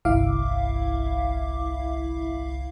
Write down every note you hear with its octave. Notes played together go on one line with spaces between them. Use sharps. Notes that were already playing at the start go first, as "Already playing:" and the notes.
G1 C2 E4 E5 F5 D6